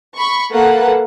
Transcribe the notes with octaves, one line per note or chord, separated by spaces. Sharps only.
B5 C#6
A#3 A4 B4 F#5